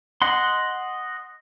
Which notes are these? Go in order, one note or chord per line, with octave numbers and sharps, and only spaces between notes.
D#5 F#5 C6